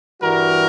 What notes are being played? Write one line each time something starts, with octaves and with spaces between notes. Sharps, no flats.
G2 E3 G3 F#4 A#4